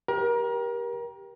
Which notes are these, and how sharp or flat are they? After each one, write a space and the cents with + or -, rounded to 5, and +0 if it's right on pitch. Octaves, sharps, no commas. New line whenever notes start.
G4 +0 A#4 +30